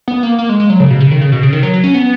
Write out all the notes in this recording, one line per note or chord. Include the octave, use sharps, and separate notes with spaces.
B3
A#3
A#3
G#3
G#3
F#3
C#3
B2
C#3
D#3
C#3
B2
C#3
D#3
F#3
F#3
C#4
B3